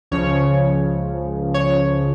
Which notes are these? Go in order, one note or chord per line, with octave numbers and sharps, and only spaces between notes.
C#2 C#3 F3 C#5
C#5